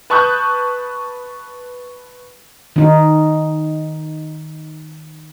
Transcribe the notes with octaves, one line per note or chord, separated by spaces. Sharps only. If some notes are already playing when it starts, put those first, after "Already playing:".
B4 A5 C#6 D#6 F#6 G6
D#3 D#4